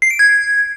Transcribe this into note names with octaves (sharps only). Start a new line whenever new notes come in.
C7
D7
G#6